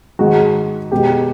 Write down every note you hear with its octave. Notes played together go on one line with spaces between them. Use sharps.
G#2 D#3 G#3 F#4
B2 G#3 G4